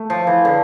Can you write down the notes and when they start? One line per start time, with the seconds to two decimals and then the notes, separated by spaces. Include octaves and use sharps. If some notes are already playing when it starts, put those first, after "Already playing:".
Already playing: A3
0.10 F3
0.27 E3
0.45 D3